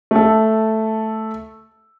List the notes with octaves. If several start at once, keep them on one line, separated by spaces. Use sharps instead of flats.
A3 A4